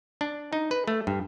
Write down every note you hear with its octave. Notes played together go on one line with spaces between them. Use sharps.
D4
D#4
B4
A3
G2